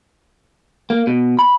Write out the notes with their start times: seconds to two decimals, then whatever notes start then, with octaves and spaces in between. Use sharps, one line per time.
0.90 A#3
1.07 B2
1.39 B5